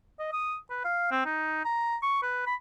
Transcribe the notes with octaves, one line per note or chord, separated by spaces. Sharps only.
D#5
D#6
B4
F5
C4
D#4
A#5
C#6
B4
B5